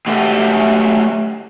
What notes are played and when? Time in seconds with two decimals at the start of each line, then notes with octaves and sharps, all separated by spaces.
0.07 F#3 A3 G4 A4 E5 F#5